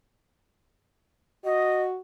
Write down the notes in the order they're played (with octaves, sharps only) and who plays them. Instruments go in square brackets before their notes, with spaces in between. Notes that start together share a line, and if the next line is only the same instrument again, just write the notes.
[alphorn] F#4 [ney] D#5